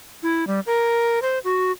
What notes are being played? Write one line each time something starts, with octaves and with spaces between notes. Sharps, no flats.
E4
G3
A#4
C5
F#4